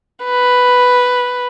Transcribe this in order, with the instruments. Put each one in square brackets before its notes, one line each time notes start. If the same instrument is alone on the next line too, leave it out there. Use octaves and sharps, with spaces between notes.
[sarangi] B4